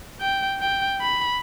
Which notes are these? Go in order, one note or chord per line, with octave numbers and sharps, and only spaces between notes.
G5
G5
B5